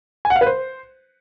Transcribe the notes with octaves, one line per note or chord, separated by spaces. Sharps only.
G#5
F#5
F5
B4
C5